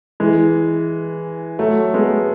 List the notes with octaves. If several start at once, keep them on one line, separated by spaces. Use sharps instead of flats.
E3 G#3
F#3 A3
G#3 B3